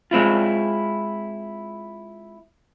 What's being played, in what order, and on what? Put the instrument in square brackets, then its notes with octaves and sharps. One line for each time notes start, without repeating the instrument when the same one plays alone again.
[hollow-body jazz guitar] G#3 C4 E4 F4